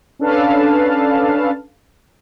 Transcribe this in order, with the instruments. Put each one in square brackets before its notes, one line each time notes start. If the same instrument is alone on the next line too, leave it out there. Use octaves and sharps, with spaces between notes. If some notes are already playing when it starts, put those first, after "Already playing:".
[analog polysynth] C#4 D4 A4 B4 F5 A5